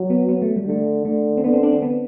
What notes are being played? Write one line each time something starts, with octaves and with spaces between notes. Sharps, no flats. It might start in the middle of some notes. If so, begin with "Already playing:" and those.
Already playing: F#3
B3
B3
A3
G3
D3 A3
D3 A3
C4
D3 B3
C4
D4
C4
B3